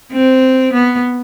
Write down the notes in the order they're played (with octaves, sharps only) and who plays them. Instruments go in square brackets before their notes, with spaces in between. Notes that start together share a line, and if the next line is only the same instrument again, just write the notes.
[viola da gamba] C4
B3